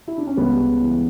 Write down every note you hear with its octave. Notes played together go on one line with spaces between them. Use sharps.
E4
D4
C#4
C#2 G3 B3
C#3
E3